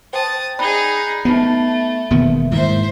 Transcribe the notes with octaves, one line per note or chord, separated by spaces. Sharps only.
C5 G5 A5 D#6
D#4 G#4 D5 B5 F#6
A3 B3 D#4 B5 C7
E1 D#3 A#3 B3
G#2 D#3 E4 C5 E5